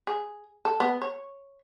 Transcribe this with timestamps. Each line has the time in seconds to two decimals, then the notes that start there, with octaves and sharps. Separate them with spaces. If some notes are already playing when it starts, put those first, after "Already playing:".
0.07 G#4
0.65 A4
0.80 B3
1.02 C#5